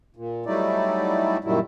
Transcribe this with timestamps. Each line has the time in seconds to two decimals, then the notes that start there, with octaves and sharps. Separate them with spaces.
0.16 A#2
0.46 F#3 G3 A3 D#4 E4 D5
1.44 F#2 A#2 D#3 F#3 G3 E4